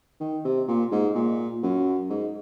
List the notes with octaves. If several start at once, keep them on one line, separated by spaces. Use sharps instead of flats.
D#3
C3
A#2
G#2
A#2
F#2
G#2